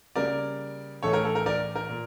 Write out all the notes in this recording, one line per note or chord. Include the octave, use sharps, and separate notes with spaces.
C#3 G3 A#3 A#4 D5
A2 E3 A3 A4 C#5
A#4
A4
A#4
A#4 D5
A#4
A#2